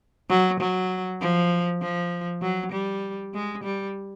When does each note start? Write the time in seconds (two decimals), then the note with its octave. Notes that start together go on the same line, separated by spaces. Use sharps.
0.29 F#3
0.60 F#3
1.21 F3
1.82 F3
2.42 F#3
2.72 G3
3.34 G#3
3.64 G3